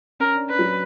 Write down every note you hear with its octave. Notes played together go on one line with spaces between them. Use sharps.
C#4 A#4
D4
D4 B4
F#3